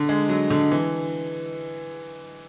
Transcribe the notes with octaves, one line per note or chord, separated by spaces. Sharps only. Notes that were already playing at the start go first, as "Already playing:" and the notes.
Already playing: D3
G#3
F#3
D3
E3